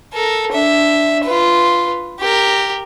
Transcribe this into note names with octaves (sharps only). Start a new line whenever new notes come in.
A4 A#4
D4 E5
F4 B4
G4 A#4